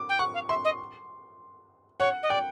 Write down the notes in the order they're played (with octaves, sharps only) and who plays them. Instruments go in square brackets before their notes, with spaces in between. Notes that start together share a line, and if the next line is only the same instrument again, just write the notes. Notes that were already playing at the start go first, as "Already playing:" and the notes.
Already playing: [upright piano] D6
[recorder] G5
[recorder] F#5 [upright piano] C#6
[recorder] F5
[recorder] E5 [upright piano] C6
[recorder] D#5
[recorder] C#5 [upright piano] F#5
[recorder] D#5
[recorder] D5 [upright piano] G5